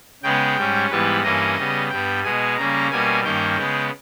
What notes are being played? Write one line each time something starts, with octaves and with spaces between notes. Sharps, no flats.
C#3 G#3 B3 G5
G#2 G3 C#4
G#2 E3 G3 B3 B4
G2 E3 A#3 C#4 D#5
C#3 G3 B3
G2 G3 B3 G5
B2 G#3 B3 G#5
C#3 G3 A#3 C#4 A#5
B2 G3 A#3 C#4 G#5
G2 D#3 A#3 C#4 G5
C#3 G#3 B3